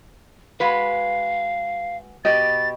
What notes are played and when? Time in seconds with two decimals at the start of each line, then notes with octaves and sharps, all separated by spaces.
0.60 G#3 F#4 B4 F5
2.25 B2 G4 D#5 A6